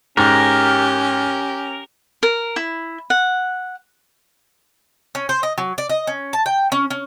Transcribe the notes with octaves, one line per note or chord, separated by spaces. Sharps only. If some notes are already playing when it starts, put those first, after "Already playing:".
G#2 C#4 G4 A#4
A#4
E4
F#5
C#4
C5
D#5
F#3
D5
D#5
C#4
A5
G5
C#4
C#4